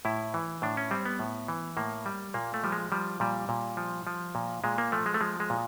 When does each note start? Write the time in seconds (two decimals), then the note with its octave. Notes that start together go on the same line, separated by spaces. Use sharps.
0.05 A2 E4
0.34 E3
0.62 A2 D4
0.77 C#4
0.91 G3 C4
1.06 B3
1.19 A2
1.48 E3
1.77 A2 A#3
2.06 G3
2.34 A#2 A#3
2.54 A3
2.64 F3 G3
2.72 G#3
2.92 F3 G3
3.20 A#2 G3
3.49 A#2
3.77 F3
4.07 F3
4.35 A#2
4.64 A#2 G#3
4.78 A#3
4.92 F3 A3
5.06 G#3
5.14 A3
5.21 F3 G#3
5.40 G#3
5.50 A#2